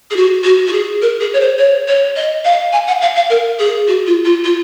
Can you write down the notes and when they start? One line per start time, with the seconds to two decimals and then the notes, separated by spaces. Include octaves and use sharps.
0.11 G#4
0.16 F#4
0.44 F#4
0.67 F#4
0.73 G#4
1.02 A#4
1.20 G#4
1.34 C#5
1.40 C5
1.59 C#5
1.88 C#5
2.16 D#5
2.45 F5
2.73 G#5
2.87 F#5
3.01 F5
3.16 F5
3.30 A#4
3.59 G#4
3.88 F#4
4.07 F4
4.25 F4
4.44 F4